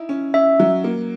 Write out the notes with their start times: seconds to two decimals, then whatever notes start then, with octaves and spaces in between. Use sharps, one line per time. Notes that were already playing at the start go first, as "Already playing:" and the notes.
Already playing: D#4 E4
0.09 C#4
0.34 C#4 E5
0.60 F#3
0.84 A#3